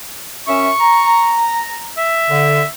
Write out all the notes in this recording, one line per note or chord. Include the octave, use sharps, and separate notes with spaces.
F#2 C#4 E5 C#6
A#5
E5
D3